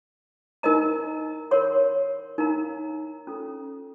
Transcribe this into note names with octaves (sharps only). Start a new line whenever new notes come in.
D#4 A#4 D#5 A#5
A#4 C#5 F#5 C6
D#4 A#4 F5 A#5
C#4 F4 A4